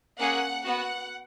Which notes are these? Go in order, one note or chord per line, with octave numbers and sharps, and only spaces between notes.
A#3 C#4 G#4 F#5
B3 F#4 F#5